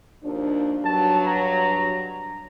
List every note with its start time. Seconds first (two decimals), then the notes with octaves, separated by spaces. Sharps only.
0.24 D#2 F3 D4
0.85 G2 F#3 A5
1.26 A#5